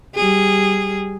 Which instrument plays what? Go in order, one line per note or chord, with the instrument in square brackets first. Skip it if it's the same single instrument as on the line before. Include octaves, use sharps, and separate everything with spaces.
[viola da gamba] G3 G#4